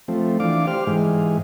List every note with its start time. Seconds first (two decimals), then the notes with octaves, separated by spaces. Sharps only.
0.08 F3 A3 C4
0.40 E3 D4 F5 D6
0.67 G4 C5 F6
0.87 G#2 E3 G#3